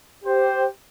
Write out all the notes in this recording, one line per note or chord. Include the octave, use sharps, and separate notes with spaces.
G4 C5